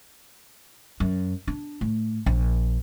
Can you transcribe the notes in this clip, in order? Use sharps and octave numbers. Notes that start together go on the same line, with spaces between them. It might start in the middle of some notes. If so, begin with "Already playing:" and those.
F#2
D4
A2
A#1